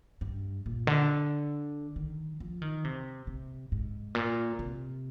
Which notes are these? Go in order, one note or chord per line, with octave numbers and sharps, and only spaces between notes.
G2
A#2
D3
D#3
F3
D#3
C3
C3
G#2
A#2
C3